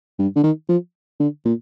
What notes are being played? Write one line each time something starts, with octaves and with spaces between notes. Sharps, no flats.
G2
D3
D#3
F3
D3
A#2